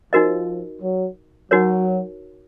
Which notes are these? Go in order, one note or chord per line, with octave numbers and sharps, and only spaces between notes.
F3 D#4 F#4 A#4 D#5
F#3
F#3 D#4 F#4 A#4 C#5